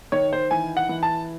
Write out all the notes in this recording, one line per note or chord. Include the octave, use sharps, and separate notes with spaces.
D#3 C#5
C5
E3 G#5
F#5
E3
A5